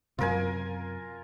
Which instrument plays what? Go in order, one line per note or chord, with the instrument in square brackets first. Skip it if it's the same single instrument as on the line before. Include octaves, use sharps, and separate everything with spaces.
[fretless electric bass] F#2 C3 [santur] F4 A#4 G#5